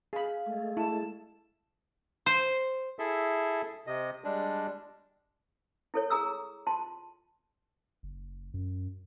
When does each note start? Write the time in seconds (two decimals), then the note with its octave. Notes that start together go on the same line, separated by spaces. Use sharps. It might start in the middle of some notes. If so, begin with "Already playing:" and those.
0.13 G#4 F5 B5
0.46 G#3 A3
0.77 E4 A5
2.26 C5
2.99 E4 G#4 A4 E5
3.87 C3 D#5
4.24 G3 G#3 D4
5.94 E4 A4 C#5
6.10 G#4 A#5 D#6 E6
6.67 F4 A5 C6
8.03 F#1
8.54 F#2